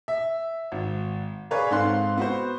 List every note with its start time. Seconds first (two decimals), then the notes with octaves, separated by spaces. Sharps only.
0.08 E5
0.72 G#1
1.51 G#4 A#4 B4 C#5 D5 F5
1.71 G#2 C4 A4 F5 C6 F#6
2.18 B3 F#4 C5